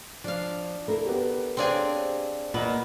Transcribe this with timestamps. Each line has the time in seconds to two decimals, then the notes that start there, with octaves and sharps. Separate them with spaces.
0.24 F3 D4 F5
0.88 E4 A4 A#4
1.06 B3 G4
1.57 C4 D4 G#4 C5 C#5 F5
2.54 A#2 B3 A#4 D#5